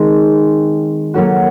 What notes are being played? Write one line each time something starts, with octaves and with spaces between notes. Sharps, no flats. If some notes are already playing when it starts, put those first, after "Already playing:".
Already playing: D#3 G#3 C4
F#3 A#3 C#4 F#4 A4